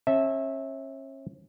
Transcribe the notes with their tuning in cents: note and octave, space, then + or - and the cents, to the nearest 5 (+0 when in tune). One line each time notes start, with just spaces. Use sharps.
C#4 -40 E5 -10 A5 +0